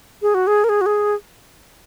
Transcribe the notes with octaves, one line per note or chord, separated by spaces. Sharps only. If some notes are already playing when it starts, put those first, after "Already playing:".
G#4
F#4
G#4
A#4
G#4
F#4
G#4